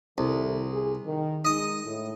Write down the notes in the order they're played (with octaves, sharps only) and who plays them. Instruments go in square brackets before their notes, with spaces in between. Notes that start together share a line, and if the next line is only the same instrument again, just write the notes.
[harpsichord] C2 [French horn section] D#3 E4 A4
[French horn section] G#4
D#3
[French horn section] G#3 D#4 [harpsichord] D#5 D#6
[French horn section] A2